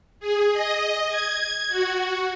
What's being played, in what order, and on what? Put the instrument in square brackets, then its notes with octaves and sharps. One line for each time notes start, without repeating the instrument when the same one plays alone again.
[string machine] G#4
D#5
G#6
F#4